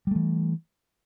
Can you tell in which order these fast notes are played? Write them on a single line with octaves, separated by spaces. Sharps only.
G3 A3 E3